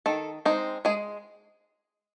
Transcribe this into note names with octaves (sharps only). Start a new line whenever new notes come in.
D#3 A4
G#3 C4 D#4
G#3 G#4